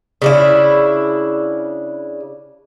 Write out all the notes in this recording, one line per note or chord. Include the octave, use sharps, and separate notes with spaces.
C#3 D4 E4